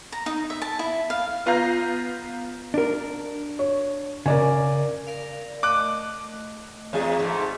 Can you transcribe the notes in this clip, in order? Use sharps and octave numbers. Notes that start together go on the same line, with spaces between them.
A#5
D#4
E5
A5
E4
F5
B3 F4 F5 A#5 G6
D4 A#4
C#5
C#3 A#4 D5 G#5
A#4 D5 F5
A3 D#5 D6 F#6
E2 G#4
G#2 A3